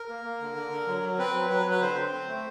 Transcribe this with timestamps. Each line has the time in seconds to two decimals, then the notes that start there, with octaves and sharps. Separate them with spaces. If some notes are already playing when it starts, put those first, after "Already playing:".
Already playing: A#4
0.09 A#3
0.24 A#3
0.40 D3
0.56 D3
0.71 D3
0.87 F#3
1.03 F#3
1.19 C4 B4
1.34 F#3
1.50 F#3 B4
1.66 F#3
1.71 B4
1.81 D3 C5
1.97 C4
2.13 C4
2.28 A3